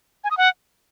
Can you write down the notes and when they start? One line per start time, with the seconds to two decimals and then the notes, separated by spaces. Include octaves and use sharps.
0.24 G#5
0.31 D#6
0.37 F#5